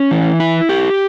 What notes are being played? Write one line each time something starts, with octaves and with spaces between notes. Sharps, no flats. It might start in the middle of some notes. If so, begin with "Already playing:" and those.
Already playing: C#4
E3
E4
G4